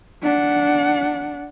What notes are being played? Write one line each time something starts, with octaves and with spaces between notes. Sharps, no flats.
D4 F#5